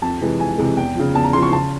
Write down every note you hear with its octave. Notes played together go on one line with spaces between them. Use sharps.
F2 A5
C3 E3 G#3
F2 G#5
C3 E3 G#3
E2 G5
C#3 F3
E2 A5
A#5
C#3 F3 C6
C#6
C#3 A5